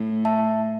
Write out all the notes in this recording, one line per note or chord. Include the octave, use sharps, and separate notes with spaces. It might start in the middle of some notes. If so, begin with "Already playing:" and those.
Already playing: A2
E5 A5